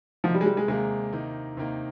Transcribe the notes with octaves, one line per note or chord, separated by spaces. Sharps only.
C3 D#3 F3 A#3 D#4
G3
G#3
G3
G#3
C3 D#3 G#3 A#3 D#4
C3 D#3 A#3 D#4
C3 D#3 A#3 D#4